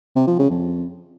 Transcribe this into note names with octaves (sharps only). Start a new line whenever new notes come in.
C3
F3
C#3
F2